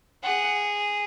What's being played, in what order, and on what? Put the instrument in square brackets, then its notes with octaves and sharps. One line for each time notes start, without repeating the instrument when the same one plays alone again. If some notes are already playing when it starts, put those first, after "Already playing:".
[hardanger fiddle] G#4 [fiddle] F#5